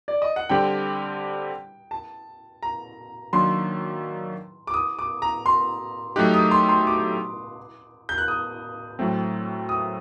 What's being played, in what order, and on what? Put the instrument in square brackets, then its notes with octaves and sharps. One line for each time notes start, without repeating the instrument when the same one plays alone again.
[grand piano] D5
D#5
F#5
[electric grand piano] D3 G3 C4 G4 [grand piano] G5
[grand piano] A5
A#5
[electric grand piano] D#3 F#3 A#3 D4 [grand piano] C6
[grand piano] D6
D#6
D6
A#5
C6
[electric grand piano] F#3 A3 D#4 G4 [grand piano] F#6
[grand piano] D#6
C6
C6
D6
G6
F#6
D#6
[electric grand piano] A2 F#3 A3 C4
[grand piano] D#6